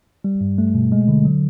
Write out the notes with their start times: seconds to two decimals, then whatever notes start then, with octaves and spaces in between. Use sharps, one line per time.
0.24 G3
0.41 G2
0.58 A3
0.75 B2
0.92 G#3
1.08 D3
1.25 F#3